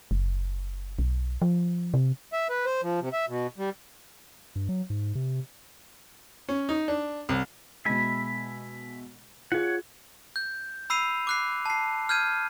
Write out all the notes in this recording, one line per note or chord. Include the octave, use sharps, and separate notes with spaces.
F#1
B1
F3
C3
E5
B4
C5
F3
C3
E5
B2
G3
G2
F#3
G#2
C3
C#4
D#4
D4
C2
B2 G#3 E5 G#5 B5
F4 G#4 C#5 F#5
G6
B5 E6 C7 D#7 F7
D6 F#6 C7
A5 C7
F6 G6 G#6 D#7